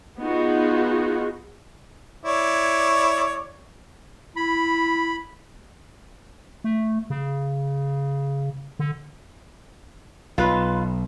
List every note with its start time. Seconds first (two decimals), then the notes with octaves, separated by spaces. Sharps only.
0.19 B3 D#4 F4 F#4 G#4
2.24 E4 C#5 D5
4.36 E4 B5
6.64 A3
7.10 C#3
8.79 D3
10.38 B1 F4 B4